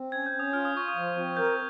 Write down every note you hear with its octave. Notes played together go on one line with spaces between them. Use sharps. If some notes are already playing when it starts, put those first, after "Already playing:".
Already playing: C4
C#4 G#6
G6
C#4
D#6
F4 F6
D#6
F4 C#6
D#6
F3
C4
A#4 G6